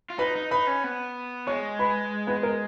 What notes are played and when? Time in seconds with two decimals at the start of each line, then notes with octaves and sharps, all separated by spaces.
0.10 F4
0.19 D#4 B4 B5
0.36 D#4
0.51 D#4 B4 B5
0.67 C#4
0.84 B3
1.47 G#3 C#5 C#6
1.79 B4 B5
2.27 B3 B4
2.43 A#4